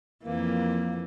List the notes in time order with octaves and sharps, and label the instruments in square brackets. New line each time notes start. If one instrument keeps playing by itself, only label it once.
[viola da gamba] F2 E3 [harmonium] A#3